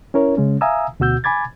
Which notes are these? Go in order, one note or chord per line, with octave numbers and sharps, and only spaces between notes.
C#4 E4 A#4 C#5
C#3 G#3 C#4
E5 F5 G#5 A#5 D#6 E6
D2 B2 F#4 E6 G6
G#5 B5 D6 G#6 A6